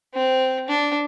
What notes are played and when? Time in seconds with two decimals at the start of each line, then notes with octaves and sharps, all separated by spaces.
0.14 C4
0.68 D4